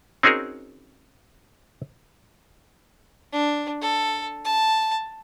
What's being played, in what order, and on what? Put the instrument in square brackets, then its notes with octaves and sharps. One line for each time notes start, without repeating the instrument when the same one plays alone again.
[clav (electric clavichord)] C4 C#4 D#4 F#4 G#4 A#4
[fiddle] D4
A4
A5